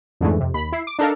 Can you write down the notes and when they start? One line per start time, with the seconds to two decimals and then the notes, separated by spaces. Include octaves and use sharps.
0.21 F2 G#2 D3 E3 G#3 A3
0.40 F2 C3
0.54 D#2 B5
0.72 E4 C7
0.87 D6
0.99 D4 D#4 A4 A#4 F5